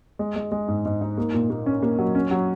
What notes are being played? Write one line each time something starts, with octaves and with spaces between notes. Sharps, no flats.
G#3
G#3
G#3
G#2
G#2
D#4
A#3
A#2
A#3
C#4
A#3
F#3
C#4
F#3